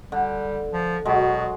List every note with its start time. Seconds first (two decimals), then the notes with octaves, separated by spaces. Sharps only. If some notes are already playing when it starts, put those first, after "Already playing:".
0.12 D3 G3
0.73 F3
1.05 B2 F#3 G#3